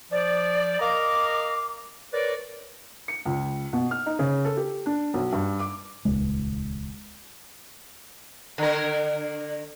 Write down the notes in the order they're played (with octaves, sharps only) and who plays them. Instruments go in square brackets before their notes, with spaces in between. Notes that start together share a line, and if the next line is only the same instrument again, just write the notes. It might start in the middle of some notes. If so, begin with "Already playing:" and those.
[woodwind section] F3 D5
A#4 D#5 F5 A#5 D6
A#4 B4 C#5 D5
[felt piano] C#7
C#2
B2
F6
D#4
C#3
A4
G4
D4
B1
G2
D6
[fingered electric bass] D#1 C#2 G#3
[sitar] D3 A#4